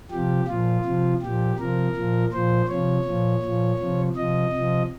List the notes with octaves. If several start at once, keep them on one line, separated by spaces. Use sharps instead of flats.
C3 F3 G4
A#2 F3 F4
C3 F3
A#2 F3 G4
C3 F3 A#4
A#2 F3
A#2 F3 C5
C3 F3 C#5
A#2 F3
A#2 F3
C3 F3
C3 F3 D#5
C3 F3